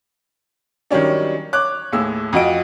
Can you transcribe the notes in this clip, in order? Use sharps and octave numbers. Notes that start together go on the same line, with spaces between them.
D#3 F#3 G3 C#4 D4
C#5 D6 F#6
D#2 A2 G#4 E6
F2 F#4 D#5 D7